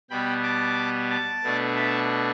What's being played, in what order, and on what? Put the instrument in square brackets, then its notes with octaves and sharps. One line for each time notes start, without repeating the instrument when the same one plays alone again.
[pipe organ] B2 G3 B3 G5 B5
A5 D6
A5 D6
B2 A3 D4
E5 A5